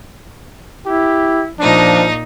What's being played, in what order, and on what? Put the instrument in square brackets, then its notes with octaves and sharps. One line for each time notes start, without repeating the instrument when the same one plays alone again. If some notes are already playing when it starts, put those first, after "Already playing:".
[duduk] E4 [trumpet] G4
[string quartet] A#2 D#4 D#5 [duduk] F3 [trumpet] D4